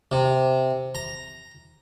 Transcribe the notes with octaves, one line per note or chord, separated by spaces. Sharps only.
C3
A#5